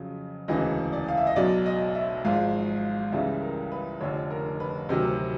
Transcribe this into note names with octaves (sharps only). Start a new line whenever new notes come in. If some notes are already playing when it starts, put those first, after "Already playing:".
Already playing: F2 C#3 F#3
E1 D2 C#3 E3 D#5
D5
F5
E5
D#5
B1 B2 F#3 D5
D#5
E5
G#1 G#2 F3 F5
C#2 C#3 E3 G3 E5
A#4
B4
F1 F2 D3 C#5
A#4
B4
D2 C3 D#3 F#3